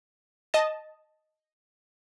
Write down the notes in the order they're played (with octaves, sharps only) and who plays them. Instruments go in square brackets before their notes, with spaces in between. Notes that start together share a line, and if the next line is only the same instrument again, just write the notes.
[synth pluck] D#5 A5